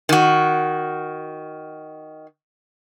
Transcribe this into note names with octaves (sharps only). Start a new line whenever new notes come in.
D#3 F#4